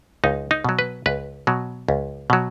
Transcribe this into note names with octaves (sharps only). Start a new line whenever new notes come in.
C#2 D#4
D#4
B2 F#3
B4
C#2 B4
B2 F#3
C#2
B2 F#3